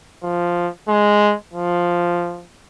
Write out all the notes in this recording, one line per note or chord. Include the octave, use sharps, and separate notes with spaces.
F3
G#3
F3